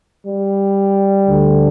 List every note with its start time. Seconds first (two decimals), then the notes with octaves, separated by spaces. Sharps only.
0.26 G3
1.25 D2 D3